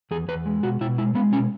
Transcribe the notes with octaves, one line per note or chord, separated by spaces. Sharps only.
E2 G#4
E2 B4
G#3
B2 F#4
B2 E4
G#3 E4
G#3 B3
B2 C#4